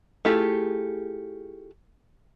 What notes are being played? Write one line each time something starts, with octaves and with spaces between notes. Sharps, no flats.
A3 E4 F4 G4 G#4